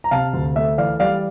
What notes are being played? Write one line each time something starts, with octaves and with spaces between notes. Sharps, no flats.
A#5
C3 F5 A5
D2
A3 E5
E3 D5 F5
G3 D5 F5